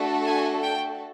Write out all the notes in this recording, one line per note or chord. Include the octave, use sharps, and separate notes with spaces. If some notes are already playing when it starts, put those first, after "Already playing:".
Already playing: A3 D4 F#4 A4
G#5
G5